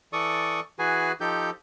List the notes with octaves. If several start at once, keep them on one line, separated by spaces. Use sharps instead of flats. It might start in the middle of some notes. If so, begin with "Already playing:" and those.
E3 A4 D5 C#6 D#6
E3 F#4 G#4 B4 G#5
F3 D#4 G4 A4 G6